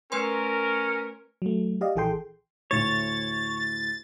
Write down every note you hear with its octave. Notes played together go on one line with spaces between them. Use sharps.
A3 C#4 A#4 B4 C6
F#3 A3
G4 D5 D#5 F5
A#1 E3 G#4 A4 G5 C6
D2 A2 C#5 A6